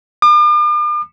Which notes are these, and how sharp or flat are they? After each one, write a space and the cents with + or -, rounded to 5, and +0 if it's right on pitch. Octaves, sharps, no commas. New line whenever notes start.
D6 +45